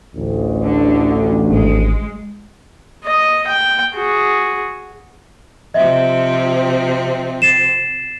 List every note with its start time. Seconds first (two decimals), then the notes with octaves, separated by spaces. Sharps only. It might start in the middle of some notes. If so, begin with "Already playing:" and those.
0.15 A1 D2
0.62 D3
1.51 G#1 G#3
3.05 D#5
3.47 G5
3.95 F#4 G#4
5.74 C3 F3 C4 D#5 E5
7.42 A6 C7 E7